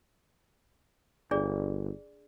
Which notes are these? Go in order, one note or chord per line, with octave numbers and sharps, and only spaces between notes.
G1 D4 G#4 D5